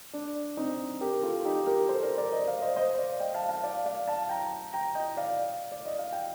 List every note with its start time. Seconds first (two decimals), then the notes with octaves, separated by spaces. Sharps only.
0.13 D4
0.57 C4 D#4
1.01 G4 A#4
1.14 A#4
1.23 F4 A4
1.45 D#4 G4
1.67 G4 A#4
1.89 A4 C5
2.03 A#4 D5
2.18 A#4 D5
2.32 C5 D#5
2.47 D5 F5
2.62 C5 D#5
2.76 C5 D#5
2.98 D5 F5
3.20 D#5 G5
3.34 F5 A5
3.49 F5 A5
3.64 D5 F5
3.86 D5 F5
4.07 F5 A5
4.29 G5 A#5
4.73 G5 A#5
4.95 D#5 G5
5.17 D5 F5
5.72 D5
5.86 D#5
5.99 F5
6.13 G5